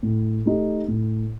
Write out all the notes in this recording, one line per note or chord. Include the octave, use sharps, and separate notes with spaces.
A2
A3 D#4 G4
A2